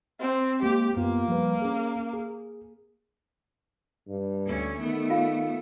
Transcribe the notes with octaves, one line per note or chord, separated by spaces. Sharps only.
C4
G#3 A#3 G4
F#2 A#3 B3 F4
F3 G3 B4
C#4 G#4
G#4
G2
D2 C#4
D#3 A3 B3
F4 F5